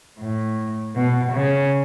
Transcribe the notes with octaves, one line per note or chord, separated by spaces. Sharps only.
A2
B2
C#3